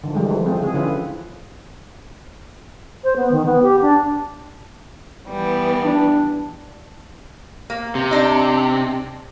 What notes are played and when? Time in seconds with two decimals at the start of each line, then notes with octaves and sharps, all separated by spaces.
0.04 D3 D#3 F3
0.15 E3 G3 G#3
0.30 E3 F3 A3
0.46 G#3 C4 F4 G#4
0.60 C#3 G#4
0.74 D3 C#4 E4 F4 B4
3.04 C5
3.16 B3
3.31 D#3
3.45 B3
3.62 G4
3.81 D4
5.28 E3 G3 B3
5.83 D4
7.70 A#3
7.95 C3
8.11 D4 D#4